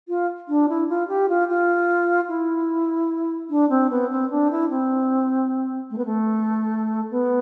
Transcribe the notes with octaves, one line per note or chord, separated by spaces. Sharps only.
F4
D4
E4
F4
G4
F4
F4
E4
D4
C4
B3
C4
D4
E4
C4
A3
B3
A3
B3